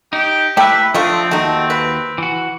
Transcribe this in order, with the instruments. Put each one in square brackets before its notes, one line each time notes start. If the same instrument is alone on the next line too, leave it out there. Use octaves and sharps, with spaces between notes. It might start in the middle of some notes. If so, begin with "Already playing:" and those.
[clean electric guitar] D#4 [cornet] G4
[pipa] C3 E4 G4 [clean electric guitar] A3 E5 [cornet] B4
[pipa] D3 A3 F4 [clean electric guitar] F3 [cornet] C4
[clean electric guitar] D#2 F#4 [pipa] A3 D#4
[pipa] B4
[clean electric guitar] E3 F#4